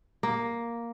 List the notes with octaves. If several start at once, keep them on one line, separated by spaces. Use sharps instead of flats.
A#3